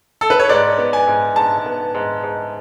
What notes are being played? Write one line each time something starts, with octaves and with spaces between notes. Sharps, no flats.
A4
B4
C#5
G#2 D5
B3
G#5
G#2
G#2 A5
B3
G#2
G#2